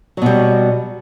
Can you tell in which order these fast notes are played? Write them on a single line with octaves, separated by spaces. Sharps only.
F#3 B2 G3